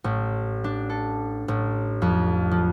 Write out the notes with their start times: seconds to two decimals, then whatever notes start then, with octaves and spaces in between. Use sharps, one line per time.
0.04 A1
0.64 D4
0.90 A4
1.48 A1
2.02 F2
2.51 F3